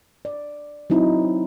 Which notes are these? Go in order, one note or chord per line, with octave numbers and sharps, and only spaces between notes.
D5
F#3 C4 D#4 E4